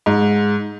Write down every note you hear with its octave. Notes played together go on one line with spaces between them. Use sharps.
G#2